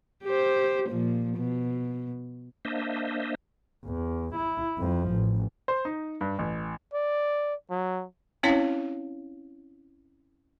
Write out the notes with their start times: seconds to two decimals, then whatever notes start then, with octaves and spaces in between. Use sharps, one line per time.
0.24 G4 C5
0.89 A#2 F3
1.37 B2
2.65 A#3 D4 C5 D#5 E5
3.86 E2
4.35 E4
4.79 F2 F3
5.11 A1
5.68 C5
5.85 D#4
6.21 G2
6.39 A1
6.93 D5
7.70 F#3
8.43 C4 C#4 E4 C#5 F5 A5